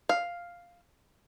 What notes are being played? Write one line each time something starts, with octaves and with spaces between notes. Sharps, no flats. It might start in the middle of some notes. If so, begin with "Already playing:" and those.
F5